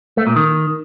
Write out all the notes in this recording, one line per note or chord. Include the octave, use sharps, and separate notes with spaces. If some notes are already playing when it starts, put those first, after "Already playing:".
A3
A#2
D#3